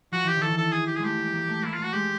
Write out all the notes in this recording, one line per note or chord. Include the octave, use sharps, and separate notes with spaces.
F3 F#4
E3 G4
D#3
A4
E3
A4
G#4
G4
G#4
G#3 A3 G4
A#3
A#3
A3
A#3 E4
F4
A3
F#4
G#3 G4